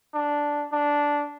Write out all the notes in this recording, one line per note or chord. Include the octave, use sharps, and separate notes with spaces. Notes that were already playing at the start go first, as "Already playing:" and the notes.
D4
D4